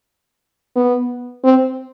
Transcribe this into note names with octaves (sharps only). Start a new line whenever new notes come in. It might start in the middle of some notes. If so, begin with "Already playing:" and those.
B3
C4